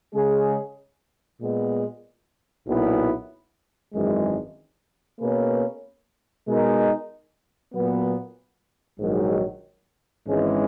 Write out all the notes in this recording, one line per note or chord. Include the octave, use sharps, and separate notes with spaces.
C#3 G#3 C#4 G#4
A#2 G#3 B3
B1 A#2 F#3 B3 E4
G#1 F#2 E3 G#3
B2 A#3 C#4 G#4 B4
B2 G#3 D#4 A#4
A#2 F#3 B3
A#1 G#2 D#3 F#3
G#1 G#2 E3 G#3 C#4